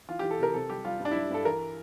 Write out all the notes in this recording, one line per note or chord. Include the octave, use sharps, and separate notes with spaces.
E3 F4
E3 G4
A4
C3 A#4
C3 A4
G3 G4
G3 F4
G2
D4
G3 E4
G2 A4
E3 A#4